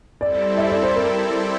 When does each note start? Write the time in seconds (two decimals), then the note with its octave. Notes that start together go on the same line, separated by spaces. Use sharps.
0.21 G3 C4 E4 A4 D5
0.57 E5
0.70 D5
0.83 C5
0.96 A#4